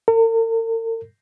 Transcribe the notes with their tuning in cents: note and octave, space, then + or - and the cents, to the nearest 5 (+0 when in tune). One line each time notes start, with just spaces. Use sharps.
A#4 -45